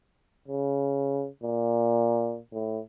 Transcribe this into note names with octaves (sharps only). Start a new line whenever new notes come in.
C#3
A#2
A2